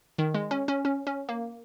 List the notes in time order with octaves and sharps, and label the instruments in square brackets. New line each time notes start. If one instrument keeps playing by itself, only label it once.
[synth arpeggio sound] D#3
G#3
C#4
C#4
C#4
C#4
A#3